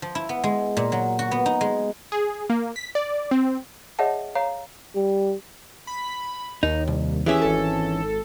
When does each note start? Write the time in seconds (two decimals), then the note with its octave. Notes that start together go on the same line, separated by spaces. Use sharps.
0.02 F3
0.15 E4
0.29 B3
0.44 G#3
0.77 A#2
0.92 F#3
1.19 F#4
1.31 B3
1.46 D#4
1.61 G#3
2.12 G#4
2.50 A#3
2.76 B6
2.95 D5
3.31 C4
3.99 G#4 C#5 D#5 E5 F#5 A5
4.35 C#5 F5 A#5
4.95 G3
5.87 B5
6.63 D#2 D#4
6.88 C2
7.26 E3 C#4 G4 G#4 E5
7.41 G#1 A4